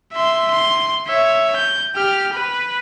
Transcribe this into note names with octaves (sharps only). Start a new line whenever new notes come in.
E5 C6
C6
C#5 E5
G6
G4 F6
B4